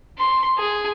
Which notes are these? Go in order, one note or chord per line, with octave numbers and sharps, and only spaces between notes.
C6
G#4